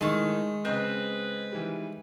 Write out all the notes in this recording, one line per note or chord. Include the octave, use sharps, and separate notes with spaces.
A2 D#3 G#3
C#3 C4 B4 D#5 G6
D#3 E3 G3